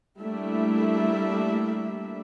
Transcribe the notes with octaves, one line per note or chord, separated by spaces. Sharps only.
G3 A3 A#3 D4 E4 E5